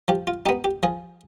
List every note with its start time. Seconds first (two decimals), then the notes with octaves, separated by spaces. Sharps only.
0.08 F3 G4
0.27 F4
0.46 D#4 G4
0.49 B3
0.64 G4
0.83 F3 G#4